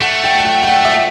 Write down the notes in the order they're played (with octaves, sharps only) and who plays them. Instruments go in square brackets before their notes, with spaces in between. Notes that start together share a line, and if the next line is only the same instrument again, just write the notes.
[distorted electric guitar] A3 [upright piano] F#5
[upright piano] G5
F#5
G5
G5
F#5
E5